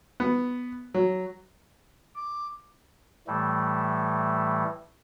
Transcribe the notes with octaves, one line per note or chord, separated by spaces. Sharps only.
B3
F#3
D6
A2 E3 G3 A3